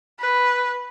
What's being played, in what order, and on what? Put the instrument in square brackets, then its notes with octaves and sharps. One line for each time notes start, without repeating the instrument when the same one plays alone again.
[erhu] B4